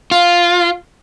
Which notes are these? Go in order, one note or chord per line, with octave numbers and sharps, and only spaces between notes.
F4